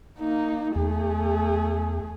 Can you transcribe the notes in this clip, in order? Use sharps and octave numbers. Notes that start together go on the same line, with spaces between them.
A#3 D#4
E2 A3 G#4